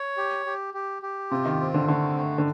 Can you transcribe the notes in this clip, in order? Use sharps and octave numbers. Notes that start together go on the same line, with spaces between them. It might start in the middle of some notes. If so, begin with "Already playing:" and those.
Already playing: C#5
G4
G4
G4
G4
C3 F4
D#3
C4
D3
D3 A3
A3
D3